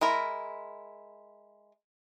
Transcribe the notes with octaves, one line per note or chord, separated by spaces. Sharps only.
G#3 E4 A#4